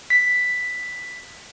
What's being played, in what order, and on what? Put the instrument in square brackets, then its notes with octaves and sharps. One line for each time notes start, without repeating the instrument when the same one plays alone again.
[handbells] B6